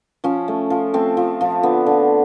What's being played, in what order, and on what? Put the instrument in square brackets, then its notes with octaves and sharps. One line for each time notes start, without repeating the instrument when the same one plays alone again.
[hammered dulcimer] F3 C#4
A3
F3
A3 C4
F3
F3
D3 B3
D3